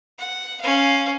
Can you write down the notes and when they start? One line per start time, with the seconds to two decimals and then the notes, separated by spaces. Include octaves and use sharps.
0.19 F#5
0.61 C#4 F5